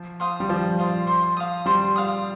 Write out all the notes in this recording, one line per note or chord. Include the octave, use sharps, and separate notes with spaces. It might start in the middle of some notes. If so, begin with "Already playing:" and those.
Already playing: F3
C5 F5 D#6
G3
F3 G4
C5 F5 D#6
C5
F5 D#6
G3 C5
F5 D#6